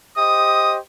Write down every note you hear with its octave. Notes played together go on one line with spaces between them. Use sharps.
G4 C5 D#5 D#6